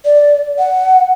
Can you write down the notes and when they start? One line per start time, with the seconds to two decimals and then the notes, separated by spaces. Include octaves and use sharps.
0.05 D5
0.58 F#5